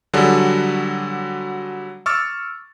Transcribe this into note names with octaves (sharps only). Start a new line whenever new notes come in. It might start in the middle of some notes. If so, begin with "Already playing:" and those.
D3 F#3 G3 F#4 G#4 A4
C#6 D6 E6 F6 A6